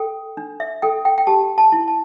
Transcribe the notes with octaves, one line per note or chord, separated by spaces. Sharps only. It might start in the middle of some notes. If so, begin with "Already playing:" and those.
Already playing: A4 G5
D4
E5
A4 G5
G5
G5
G4 A5
A5
E4
A5